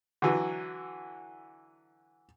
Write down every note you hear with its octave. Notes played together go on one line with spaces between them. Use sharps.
D3 E3 F#3